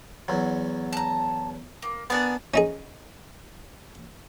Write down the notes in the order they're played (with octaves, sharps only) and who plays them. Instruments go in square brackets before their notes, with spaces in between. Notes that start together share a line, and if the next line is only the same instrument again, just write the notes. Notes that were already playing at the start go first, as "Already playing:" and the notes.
[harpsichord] E2 F#3
[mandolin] A5 A#5
A#3
[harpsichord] B3 D4 A5 [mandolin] G#4 A#4 F#5
[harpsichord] C#4 D#4 G#4